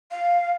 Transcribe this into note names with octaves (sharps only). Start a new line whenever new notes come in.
F5